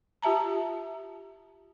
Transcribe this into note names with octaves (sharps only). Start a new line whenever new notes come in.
F4 G4 E5 A5 A#5